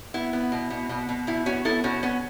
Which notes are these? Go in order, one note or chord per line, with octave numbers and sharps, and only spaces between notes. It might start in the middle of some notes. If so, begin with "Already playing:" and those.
B3 E4
B3
B2
B2
B2
B2
B2 E4
B3 C#4 F#4
B3 E4 A4
B2 C#4 F#4
B3 C#4